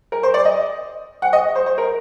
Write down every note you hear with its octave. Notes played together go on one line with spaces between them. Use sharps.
A#4
C5
D5
D#5
F#5
D#5
C5
C5
A#4